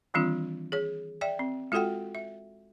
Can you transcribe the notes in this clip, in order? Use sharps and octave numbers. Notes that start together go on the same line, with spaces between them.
D#3 E3 G3 C4 D4 F4
G#4 C#5
D5 E5 G5
C4
G#3 F4 F#4 A4 F#5 G5
E5